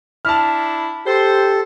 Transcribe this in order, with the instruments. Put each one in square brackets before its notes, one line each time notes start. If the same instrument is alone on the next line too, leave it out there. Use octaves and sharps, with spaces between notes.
[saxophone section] D4 E4 [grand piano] A5 F6
[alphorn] G4 [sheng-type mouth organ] A4 [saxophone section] C5